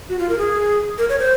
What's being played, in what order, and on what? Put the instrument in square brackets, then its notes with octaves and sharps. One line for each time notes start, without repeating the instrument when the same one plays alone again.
[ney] F#4
F4
A#4
G#4
A#4
C#5
C5